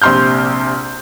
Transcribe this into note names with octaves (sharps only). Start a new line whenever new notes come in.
A#1 C3 C6 F6 G6